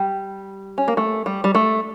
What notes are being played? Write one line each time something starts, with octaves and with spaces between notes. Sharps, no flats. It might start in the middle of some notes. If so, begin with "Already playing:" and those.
Already playing: G3
C#4
A#3
A3
G3
G3
A3